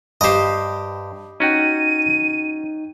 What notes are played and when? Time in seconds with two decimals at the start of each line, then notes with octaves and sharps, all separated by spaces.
0.21 G2 G4 C5 D#5
1.40 C#4 D#4 F#4 G5 D#7